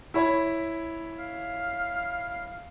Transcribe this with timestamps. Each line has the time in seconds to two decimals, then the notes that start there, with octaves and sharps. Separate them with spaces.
0.14 E4 C#5 B5
1.19 F5